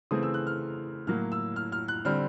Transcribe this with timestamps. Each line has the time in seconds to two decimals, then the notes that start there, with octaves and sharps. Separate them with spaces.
0.11 C#3 E3 A3 C4 D#6
0.23 E6
0.34 F#6
0.47 F6
1.07 A2 F#3 A#3 F6
1.32 E6
1.56 F6
1.72 F6
1.88 F#6
2.05 D3 G3 C4 F6